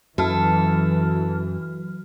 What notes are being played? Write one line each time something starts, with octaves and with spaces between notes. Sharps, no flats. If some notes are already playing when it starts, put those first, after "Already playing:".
F#2 E3 F#3 F#4 A4 F6